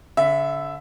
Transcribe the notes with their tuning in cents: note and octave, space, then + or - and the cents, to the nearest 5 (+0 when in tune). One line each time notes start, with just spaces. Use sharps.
D3 -40 E5 +0